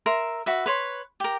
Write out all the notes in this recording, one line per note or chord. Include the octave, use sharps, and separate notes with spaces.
A#4 E5 C6
F#4 B4 E5
B4 C#5 C6
G4 A#4